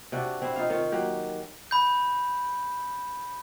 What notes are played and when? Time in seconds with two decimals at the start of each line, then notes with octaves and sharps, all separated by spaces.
0.12 C3 D4 F#4
0.42 C4 E4
0.56 D#4 F4 F5
0.70 D#3 F4 C#5
0.92 F#3 A#3 G4
1.71 B5 G6